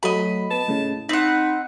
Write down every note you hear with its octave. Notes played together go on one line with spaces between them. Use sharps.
F#3 A3 F#4 D#5 B5
B3 A5
A2 C#3
C4 D#4 F#5 B5